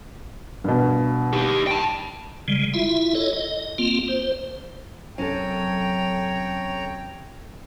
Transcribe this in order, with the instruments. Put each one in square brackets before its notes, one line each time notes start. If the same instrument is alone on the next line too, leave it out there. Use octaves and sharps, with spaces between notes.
[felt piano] G2 B2
[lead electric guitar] D#4 G4
G5 A5
[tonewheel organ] C#3 G3 G#3
E4 F4 E5
A4 C#5 D#5
D#5
A#3 C4 F4
C5
[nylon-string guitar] F#2 C3 F#3 [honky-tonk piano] C#4 A4 [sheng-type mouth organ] C#5 A#5 [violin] G5